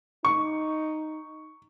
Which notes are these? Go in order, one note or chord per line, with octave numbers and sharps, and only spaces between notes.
D#4 C#6